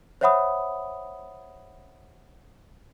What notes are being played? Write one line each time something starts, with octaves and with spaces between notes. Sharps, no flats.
C5 C#5 E5 F#5 B5 D#6